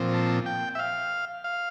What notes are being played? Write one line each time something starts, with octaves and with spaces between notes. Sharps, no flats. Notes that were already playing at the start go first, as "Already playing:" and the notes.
Already playing: A#2 F3 C4
A5
G5
E5
F5
F5